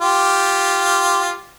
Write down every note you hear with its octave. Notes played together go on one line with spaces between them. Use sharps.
F4 G4